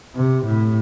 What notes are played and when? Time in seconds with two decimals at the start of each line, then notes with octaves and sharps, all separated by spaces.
0.15 C3
0.45 A2